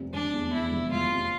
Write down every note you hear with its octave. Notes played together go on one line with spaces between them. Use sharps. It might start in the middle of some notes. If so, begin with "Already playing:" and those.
Already playing: F1 C3
F1 D4
E2
E2 E4
F1
F1 F4
C3